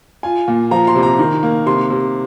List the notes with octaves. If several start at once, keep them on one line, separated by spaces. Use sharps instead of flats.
F4 G#5
A#2
F3 A#5
C6
C3
A#5
D#3
A#3
C3 C6
C3